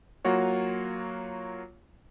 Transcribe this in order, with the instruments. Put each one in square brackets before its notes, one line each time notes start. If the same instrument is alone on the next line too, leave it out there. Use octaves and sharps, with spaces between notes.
[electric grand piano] F#3 A#3 F4 F#4 C#5